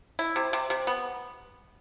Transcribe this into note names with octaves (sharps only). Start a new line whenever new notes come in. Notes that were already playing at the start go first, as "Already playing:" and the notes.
E4
C3
C3
C3
B3